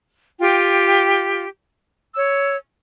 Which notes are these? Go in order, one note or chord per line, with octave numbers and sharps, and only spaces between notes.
F4 G4 G5
C#5 E6